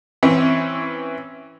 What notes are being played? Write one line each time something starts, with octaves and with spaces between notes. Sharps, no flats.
E3 C4 C#4